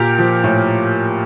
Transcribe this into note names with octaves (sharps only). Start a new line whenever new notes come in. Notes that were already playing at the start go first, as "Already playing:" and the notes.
Already playing: A#2 G4 A#4
F3
A2